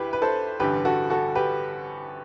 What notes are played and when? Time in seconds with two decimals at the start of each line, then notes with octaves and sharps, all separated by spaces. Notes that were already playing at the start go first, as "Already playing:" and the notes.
Already playing: D2 E4 G4 B4
0.13 B4
0.22 A4 C5
0.59 A1 G2 D3 G4 B4
0.85 F#4 A4
1.10 F#4 A4
1.35 G4 B4